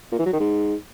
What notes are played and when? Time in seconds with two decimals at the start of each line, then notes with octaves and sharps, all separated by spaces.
0.12 A#2
0.19 E3
0.26 F#3
0.33 D#3
0.40 G#2